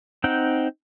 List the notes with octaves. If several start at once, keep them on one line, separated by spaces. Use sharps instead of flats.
C4 D#4 F#5 G5